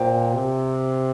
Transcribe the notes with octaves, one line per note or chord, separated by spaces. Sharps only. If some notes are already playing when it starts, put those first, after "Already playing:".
Already playing: A#2 C5 G5
C3